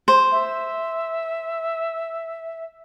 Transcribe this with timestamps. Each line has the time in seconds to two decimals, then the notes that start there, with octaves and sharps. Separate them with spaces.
0.08 C5
0.32 E5